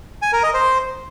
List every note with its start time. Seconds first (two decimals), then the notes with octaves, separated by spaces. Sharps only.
0.22 G#5
0.33 A#4
0.43 D#5
0.54 C5